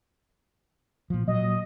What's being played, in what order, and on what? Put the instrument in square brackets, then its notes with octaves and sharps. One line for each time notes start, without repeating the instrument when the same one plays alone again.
[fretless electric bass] A#2 F3
[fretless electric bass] A#2 F#3 [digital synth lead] D#5